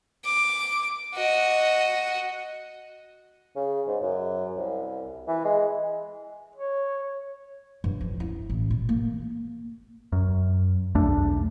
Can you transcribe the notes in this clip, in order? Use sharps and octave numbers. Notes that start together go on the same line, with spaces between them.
D6
F#4 D#5
C#3
G#2
F#2
C2
E3
G#3
C#5
G2
F3
E4
A1
A#2
A#3
F#2
B1 E2 A3 D4